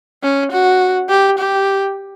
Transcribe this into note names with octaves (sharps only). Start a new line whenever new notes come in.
C#4
F#4
G4
G4